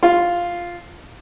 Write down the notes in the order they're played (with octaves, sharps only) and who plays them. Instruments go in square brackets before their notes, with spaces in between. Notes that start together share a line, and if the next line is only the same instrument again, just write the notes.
[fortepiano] F4